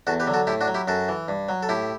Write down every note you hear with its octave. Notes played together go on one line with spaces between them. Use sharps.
E2 F#4 A4
G4 B4
D3 F#3
F#4 A4
A2 E4 G4
D4 F#4
F#3
E4 G4
F#2 F#4 A4
E3
G2
F#3
A4
A2 E4 G4